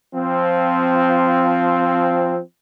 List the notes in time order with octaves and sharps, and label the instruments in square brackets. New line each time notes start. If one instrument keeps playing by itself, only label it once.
[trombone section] F3 C4